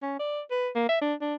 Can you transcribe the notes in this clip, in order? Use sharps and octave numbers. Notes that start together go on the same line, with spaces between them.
C#4
D5
B4
A#3
E5
D4
D4